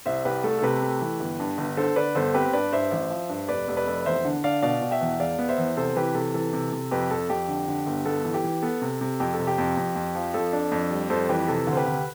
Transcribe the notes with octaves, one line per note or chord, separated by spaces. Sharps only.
C2 C5 E5
C2 G4 B4
A3 A4
A4
C3 G4 B4
A3
E3
G1
G2
G1
D3 A4 C5
D3 B4 D5
G1 A4 C5
C4 G4 B4
G2 B4 D5
G2 C5 E5
A1
F3
G2
F1 B4 D5
F1
B4 D5
F1
E2 C5 E5
D3
D3 D5 F5
B2 D5 F5
B2
E5 G5
E2
E1 D5 F5
B3
C5 E5
E2
C3 A4 C5
E3 G4 B4
C3 A4
E3 A4
C3
C3
F2 G4 B4
F2 A4
F2 G4
D3
D3
G1
B3 A4
E3
G4
E3
B3 A4
C3
C3
F2 G4
A4
C3
G4
F2
F2
F2
F3
F2 A4
D4
F2
G3
F2 A4 C5
E3 G4 B4
C3 A4
D2
C5
G4 B4
D2